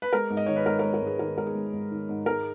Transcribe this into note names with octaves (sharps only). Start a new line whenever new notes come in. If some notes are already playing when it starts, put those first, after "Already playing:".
B4
G#3 A#4
G#2
D#5
D#3 C#5
B4
G#2 A#4
G#3 A#4 C#5
A#4
G#2
G#4 B4
D#3 A#4
G#2 A#4
G#4
G#3
G#2
D#3
G#2
G#3 A#4